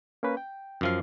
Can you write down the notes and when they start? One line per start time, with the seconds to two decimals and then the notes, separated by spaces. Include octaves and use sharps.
0.23 A#3 C#4 B4
0.37 G5
0.81 F#2 F3 F5